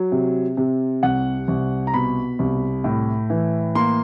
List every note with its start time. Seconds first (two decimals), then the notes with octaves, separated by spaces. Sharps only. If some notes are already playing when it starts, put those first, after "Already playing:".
Already playing: F#3
0.12 C3
0.57 C3
1.03 C2 F#5
1.48 C2
1.87 A#5
1.94 B2 B5
2.39 C2
2.84 A2
3.30 E3
3.75 A#3 C6